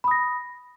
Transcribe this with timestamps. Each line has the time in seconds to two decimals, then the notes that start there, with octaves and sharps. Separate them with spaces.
0.04 B5
0.08 D#6
0.11 A#6